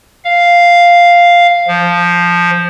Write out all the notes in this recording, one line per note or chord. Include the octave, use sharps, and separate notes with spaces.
F5
F3